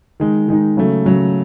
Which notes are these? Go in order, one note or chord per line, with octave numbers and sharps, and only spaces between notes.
D#3 G#3 D#4
D#3 G#3 D#4
C#3 F#3 A3
C#3 F#3 A3